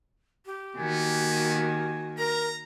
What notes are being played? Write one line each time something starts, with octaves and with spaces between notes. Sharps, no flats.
G4
D#3 A#3 B3 F#4 G#5
A#4 A#5